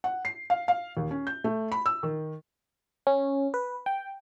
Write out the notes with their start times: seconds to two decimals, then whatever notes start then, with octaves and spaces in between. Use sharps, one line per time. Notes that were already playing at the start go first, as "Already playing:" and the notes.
0.04 F#5
0.25 C7
0.50 F5
0.68 F5
0.97 D#2
1.11 C#4
1.27 G6
1.44 A3
1.72 B5
1.86 E6
2.03 D#3
3.07 C#4
3.54 B4
3.86 G5